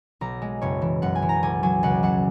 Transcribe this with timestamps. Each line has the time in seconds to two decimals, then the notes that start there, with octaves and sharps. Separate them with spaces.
0.21 B1 A#5
0.42 G#3
0.62 F#1 C#5
0.82 E3
1.02 F#1 F#5
1.15 G#5
1.22 E3
1.29 A#5
1.43 B1 G#5
1.63 F#3 G#5
1.83 C#2 F#5
2.03 F#3 F#5